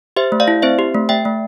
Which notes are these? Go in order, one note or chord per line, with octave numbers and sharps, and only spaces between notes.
G4 C5 E5
A3
D5 F5
E4
C4 C5 E5
G4
A3
A3 E5 G5
A3